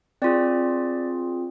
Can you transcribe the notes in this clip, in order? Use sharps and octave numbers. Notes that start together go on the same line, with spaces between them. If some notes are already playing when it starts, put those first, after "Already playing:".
C4 F4 G#4 D5